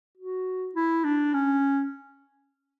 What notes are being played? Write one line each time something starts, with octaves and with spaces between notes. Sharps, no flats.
F#4
E4
D4
C#4